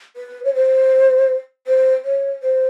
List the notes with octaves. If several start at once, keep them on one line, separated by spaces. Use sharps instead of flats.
B4
C#5
C5
C5
C#5
C5